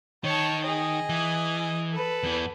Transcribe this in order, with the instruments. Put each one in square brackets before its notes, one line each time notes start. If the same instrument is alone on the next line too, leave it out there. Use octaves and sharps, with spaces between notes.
[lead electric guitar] D#3 [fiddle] C#5 A5
[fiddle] G#4 D#5
[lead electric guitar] E3
[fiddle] A4 B4
[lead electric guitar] E2 E3